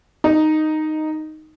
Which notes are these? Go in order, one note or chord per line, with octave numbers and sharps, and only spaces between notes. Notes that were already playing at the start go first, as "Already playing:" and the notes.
D#4